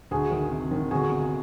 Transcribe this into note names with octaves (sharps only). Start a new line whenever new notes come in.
D2 F#4 G#4
D#3
C3
D#3
G1 F#4 G#4
C3